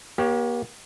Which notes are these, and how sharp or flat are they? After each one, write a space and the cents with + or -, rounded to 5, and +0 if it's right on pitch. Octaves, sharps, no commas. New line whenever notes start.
A#3 +40 G4 +0 C#5 +0